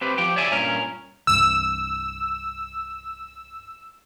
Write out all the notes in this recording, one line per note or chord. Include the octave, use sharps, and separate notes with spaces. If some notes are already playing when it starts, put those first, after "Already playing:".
C4 G4 B4
F3 G4 G5
C#5 D5 E5 G#5
G2 A#2 C#4 A#4
C2 G2 E6